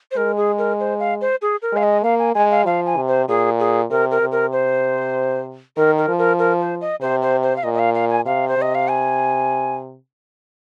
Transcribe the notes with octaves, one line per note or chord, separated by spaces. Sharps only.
C5
G#3 A#4
G#4
A#4
C5
F5
C5
G#4
A#4
G#3 F5
D#5
A#3 F5
G#5
G#3 G#5
F5
F3 F5
G#5
C3
C5
A#2 G#4
G#4
C3 A#4
A#4
C3
A#4
C5
D#3 A#4
A#4
F3
A#4
A#4
C5
D#5
C3 C5
C5
C5
F5
A#2 D#5
D#5
F5
F5
G#5
C3 F5
C5
C3 D#5
F5
G#5